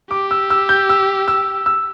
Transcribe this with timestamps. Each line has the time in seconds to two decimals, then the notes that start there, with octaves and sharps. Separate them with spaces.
0.11 G4 D6
0.31 E6
0.50 E6
0.69 G6
0.89 E6
1.28 E6
1.66 E6